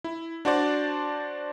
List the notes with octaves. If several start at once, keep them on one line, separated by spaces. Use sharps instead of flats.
E4
D4 F#4 C5 D5